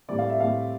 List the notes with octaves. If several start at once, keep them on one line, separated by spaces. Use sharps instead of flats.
A2 G3 C4 D5
F5
E5
A2 G3 C4 F5